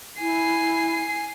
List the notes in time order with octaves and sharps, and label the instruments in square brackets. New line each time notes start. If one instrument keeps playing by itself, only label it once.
[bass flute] E4 [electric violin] G#5 C7